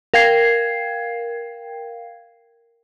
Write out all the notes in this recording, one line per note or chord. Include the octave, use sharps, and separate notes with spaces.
A#4 F5 G5 G#6 C7